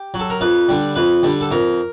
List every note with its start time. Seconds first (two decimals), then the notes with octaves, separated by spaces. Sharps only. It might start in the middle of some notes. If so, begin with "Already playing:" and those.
Already playing: G4
0.14 F#3
0.20 A4
0.30 A#4
0.41 F2 B4
0.69 D3 G3
0.96 F2 B4
1.23 D3 G3
1.41 A4
1.51 F2 A#4